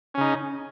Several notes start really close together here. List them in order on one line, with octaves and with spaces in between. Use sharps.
C#4 C#3 D#4